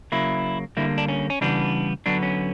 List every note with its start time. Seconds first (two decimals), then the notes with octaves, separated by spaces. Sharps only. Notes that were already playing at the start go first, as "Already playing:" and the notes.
0.12 C#3 F#3 A#3 E4
0.77 D3 G3 A#3 E4
0.98 D4
1.08 C#4
1.30 C#4
1.41 C#3 E3 G3 B3 D4
2.06 D3 F#3 B3 D4
2.23 C#4